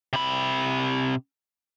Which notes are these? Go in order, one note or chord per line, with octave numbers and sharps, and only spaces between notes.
C3 B5